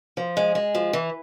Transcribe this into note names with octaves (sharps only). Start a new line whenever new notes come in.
F3
G#3
G#3
F3
E3